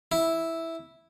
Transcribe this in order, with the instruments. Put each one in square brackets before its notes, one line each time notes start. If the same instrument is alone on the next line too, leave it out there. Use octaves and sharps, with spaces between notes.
[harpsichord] E4